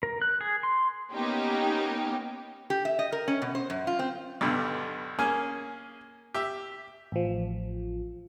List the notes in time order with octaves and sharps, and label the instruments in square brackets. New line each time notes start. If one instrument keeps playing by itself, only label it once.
[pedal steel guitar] A#4
F#6
G#4
C6
[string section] A#3 B3 C#4 D#4 G4
[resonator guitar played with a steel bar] G4
E5
D#5
A#4
C#4
B2
C5
F#2
F4
C4
[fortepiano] B1 G2 B2 D3
A#3 C#4 G#4 G#5
G4 E5
[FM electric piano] A1 F3